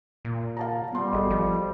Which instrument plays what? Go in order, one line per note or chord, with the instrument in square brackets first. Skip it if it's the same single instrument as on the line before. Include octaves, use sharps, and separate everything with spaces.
[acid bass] A#2
[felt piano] F5 A5 A#5
[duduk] G3 [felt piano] B3 C6
[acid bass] G#1 [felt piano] F#4 A4 D#5
[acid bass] F3